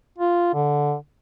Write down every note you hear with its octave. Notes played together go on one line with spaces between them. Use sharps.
F4
D3